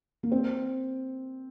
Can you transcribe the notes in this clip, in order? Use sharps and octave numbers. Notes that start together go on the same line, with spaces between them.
A#3
C4